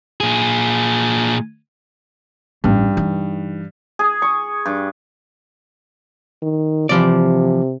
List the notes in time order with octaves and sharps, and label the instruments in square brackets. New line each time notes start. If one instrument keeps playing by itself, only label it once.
[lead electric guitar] A#2 G#4
[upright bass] A1 [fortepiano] G2
[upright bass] E3 D#4
[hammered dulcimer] G#4
C#6
G2
[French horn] D#3
[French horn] C3 [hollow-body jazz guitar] E3 F3 D5